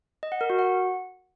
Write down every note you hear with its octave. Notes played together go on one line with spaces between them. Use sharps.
D#5
F#5
A#4
F#4
F#5